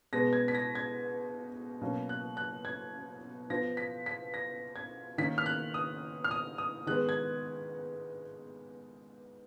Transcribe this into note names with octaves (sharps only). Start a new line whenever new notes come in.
B2 G#3 B3 A#6
G#6
B6
A#6
G#6
B2 F#3 A#3 C#4
F#6
F#6
G#6
F3 B3 A#6
B6
B6
A#6
G#6
D#3 A#3 C#4 B6
F6
F#6
D#6
F6
D#6
D#6
D#3 G#3 B3 F#6
G#6